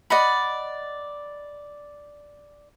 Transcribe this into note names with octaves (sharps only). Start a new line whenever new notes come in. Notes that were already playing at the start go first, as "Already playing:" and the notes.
D5 D#5 F#5 B5